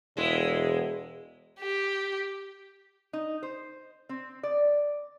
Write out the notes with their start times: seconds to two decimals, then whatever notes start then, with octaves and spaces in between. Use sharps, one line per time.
0.17 E1 G#3 E4
1.60 G4
3.13 D#4
3.43 C5
4.09 C4
4.43 D5